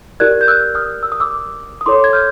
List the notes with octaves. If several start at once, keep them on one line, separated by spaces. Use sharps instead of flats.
E4 G4 A#4 D5 F#6 G#6
G6
E6 F#6
D#6 F6
E6
D#6
D6 E6
D#6
E4 A4 C#5 C6 D6
G#6
F6 G6